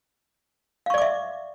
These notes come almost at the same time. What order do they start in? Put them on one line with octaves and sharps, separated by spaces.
F5 C#6 D5 D6 E5